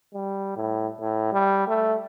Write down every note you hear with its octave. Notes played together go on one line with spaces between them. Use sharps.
G3
A2
A2
G3
A3